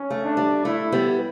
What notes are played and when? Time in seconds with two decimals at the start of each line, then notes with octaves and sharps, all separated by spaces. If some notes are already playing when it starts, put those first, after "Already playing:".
Already playing: C#4
0.10 A3
0.24 D4
0.37 G3
0.65 A3 E4
0.92 G3 B3